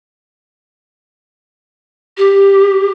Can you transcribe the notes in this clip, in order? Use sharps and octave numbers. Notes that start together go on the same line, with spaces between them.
G4